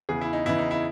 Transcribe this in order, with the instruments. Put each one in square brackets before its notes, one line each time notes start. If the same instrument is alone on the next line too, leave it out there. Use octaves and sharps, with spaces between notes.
[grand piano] E2 C#3 E3 G#4
E4
D#4
E2 C#3 E3 E4
D#4
E4